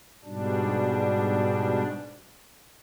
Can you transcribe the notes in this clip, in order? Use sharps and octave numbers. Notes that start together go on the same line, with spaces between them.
G#2 B2 G3 D4